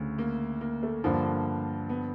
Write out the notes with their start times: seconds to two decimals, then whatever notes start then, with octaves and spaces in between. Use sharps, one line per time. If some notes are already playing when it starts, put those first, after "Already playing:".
Already playing: D2 C#3
0.18 A#3
0.61 A#3
0.83 A3
1.04 G2 D3 F3 A#3
1.26 A#3
1.89 B3